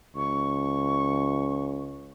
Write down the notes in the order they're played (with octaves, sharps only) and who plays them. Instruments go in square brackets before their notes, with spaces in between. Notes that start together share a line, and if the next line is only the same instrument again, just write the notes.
[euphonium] C#2 [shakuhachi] C#6